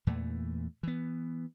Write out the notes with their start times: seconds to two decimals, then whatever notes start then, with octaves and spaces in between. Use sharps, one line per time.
0.07 E2 A#2 E3 A3
0.83 E3 B3